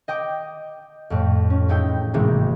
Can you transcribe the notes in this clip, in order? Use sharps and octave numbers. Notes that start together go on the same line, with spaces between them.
D#5 G5 D6
F2 A2
C#4
E1 D#4 E4 G5
G#1 C3 E3 G#3 A#3 D#4